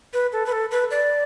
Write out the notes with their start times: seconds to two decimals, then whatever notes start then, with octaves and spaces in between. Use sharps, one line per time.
0.13 B4
0.32 A4
0.46 B4
0.52 A4
0.71 B4
0.91 D5